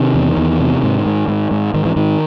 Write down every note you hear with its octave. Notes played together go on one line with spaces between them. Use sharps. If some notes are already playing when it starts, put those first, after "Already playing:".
Already playing: C3 D#3
E2
E2
C3
G#2
G#2
G#2
G#2
G#2 D#3
E3
G#2 D#3